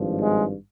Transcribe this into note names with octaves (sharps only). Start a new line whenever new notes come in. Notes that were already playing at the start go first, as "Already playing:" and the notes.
Already playing: G#1 G2 F3
G#3